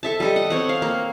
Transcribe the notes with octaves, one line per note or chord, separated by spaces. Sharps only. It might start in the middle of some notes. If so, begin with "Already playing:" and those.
A4 E5 A5
G3 A4 D#5
F#5
C4 C#5 F#5
F5
A#3